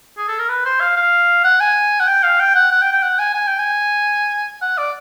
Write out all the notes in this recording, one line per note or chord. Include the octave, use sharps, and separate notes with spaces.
G#4
A4
A#4
B4
C5
F5
F5
F#5
G#5
F#5
G5
F5
G5
F#5
F#5
G5
G5
F#5
G#5
G#5
G5
G#5
F#5
D5